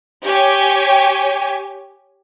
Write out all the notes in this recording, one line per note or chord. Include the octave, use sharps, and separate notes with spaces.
G4 C#5 G5 G#5